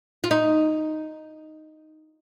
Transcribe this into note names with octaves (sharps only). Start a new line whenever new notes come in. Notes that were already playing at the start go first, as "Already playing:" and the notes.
F4
D#4